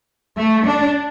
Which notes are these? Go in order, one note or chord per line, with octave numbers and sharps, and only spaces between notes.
A3
D4